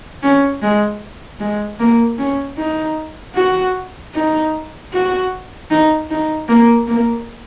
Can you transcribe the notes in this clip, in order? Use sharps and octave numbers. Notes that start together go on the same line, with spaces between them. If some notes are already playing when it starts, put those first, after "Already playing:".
C#4
G#3
G#3
A#3
C#4
D#4
F#4
D#4
F#4
D#4
D#4
A#3
A#3